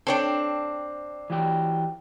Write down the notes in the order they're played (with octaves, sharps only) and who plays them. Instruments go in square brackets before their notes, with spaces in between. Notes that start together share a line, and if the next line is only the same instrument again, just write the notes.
[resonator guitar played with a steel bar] C4 D4 [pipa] A4 C#5 G5
[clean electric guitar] E3 F#4 G4